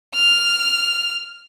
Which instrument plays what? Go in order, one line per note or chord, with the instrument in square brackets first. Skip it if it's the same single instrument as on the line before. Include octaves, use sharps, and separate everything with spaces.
[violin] F6